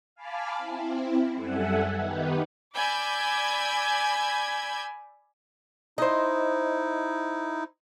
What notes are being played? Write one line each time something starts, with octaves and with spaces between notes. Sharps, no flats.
F5 G#5 A5 B5 D6 F6
C4 E4
F#2 G3 A4 E5 F#5 G#5
D#3 B3 D#4 G4 B4
D5 G#5 B5 E6 G6 G#6
D#4 E4 C5 D#5